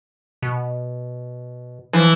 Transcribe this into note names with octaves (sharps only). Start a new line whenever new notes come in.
B2
E3 F3